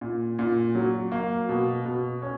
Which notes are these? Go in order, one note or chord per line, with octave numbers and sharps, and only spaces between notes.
A#2
A#2
F#3
A#3
B2
B2
C#4